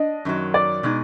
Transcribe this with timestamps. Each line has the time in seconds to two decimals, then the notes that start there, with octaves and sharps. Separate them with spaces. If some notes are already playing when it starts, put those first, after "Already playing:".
Already playing: D4 D#5
0.25 F#2 D#3 F#3
0.54 D5
0.83 B2 G#3 D#4